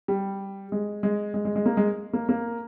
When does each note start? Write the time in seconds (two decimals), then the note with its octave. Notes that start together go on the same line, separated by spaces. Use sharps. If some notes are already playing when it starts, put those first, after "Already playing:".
0.08 G3
0.72 G#3
1.03 G#3
1.34 G#3
1.45 G#3
1.56 G#3
1.66 A#3
1.77 G#3
2.13 A#3
2.29 A#3